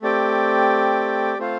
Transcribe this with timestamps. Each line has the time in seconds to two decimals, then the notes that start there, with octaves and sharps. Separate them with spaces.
0.02 A3 C4 G4 D5 G5
1.39 A3 C4 F4 C5 F5